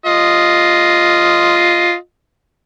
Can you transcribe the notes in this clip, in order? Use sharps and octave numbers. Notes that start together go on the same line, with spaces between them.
F4 D#5